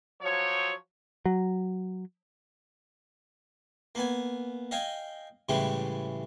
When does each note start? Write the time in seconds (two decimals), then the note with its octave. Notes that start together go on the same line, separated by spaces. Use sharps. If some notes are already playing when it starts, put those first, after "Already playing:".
0.21 F3 F#3 C#5
1.26 F#3
3.95 A#3 B3 G#5
4.71 D#5 F5 G5 G#5
5.49 A2 C#3 E3 G3 G#3